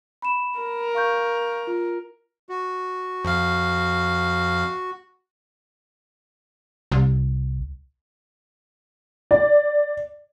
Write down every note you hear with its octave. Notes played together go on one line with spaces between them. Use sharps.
B5 E7
A#4
F5 C#6 G6
F4
F#4
F2 F5
C2
D5